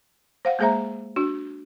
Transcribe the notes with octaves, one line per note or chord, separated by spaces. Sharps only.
C5 F5 F#5
G#3 A#3 G#4 C5 E5 A#5
D4 F#4